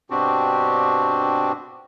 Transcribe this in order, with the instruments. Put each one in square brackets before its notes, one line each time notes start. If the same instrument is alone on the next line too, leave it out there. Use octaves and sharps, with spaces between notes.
[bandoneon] G2 B2 C4 D4 F#4 G4